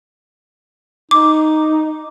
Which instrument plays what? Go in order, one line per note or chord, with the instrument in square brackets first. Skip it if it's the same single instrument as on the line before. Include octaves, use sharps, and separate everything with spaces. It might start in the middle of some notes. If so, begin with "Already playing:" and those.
[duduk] D#4 [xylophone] D6